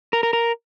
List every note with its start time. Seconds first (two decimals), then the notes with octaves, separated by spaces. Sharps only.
0.13 A#4
0.23 A#4
0.33 A#4